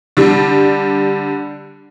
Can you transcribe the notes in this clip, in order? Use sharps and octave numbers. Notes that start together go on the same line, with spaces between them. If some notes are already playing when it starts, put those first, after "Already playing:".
D3 G3